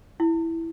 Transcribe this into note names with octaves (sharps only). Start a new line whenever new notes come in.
E4